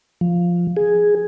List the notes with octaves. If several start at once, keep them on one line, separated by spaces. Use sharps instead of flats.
F3
G#4